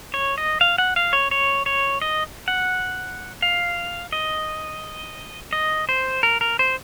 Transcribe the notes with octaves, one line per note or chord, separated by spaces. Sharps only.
C#5
D#5
F5
F#5
F5
C#5
C#5
C#5
D#5
F#5
F5
D#5
D#5
C5
A#4
A#4
C5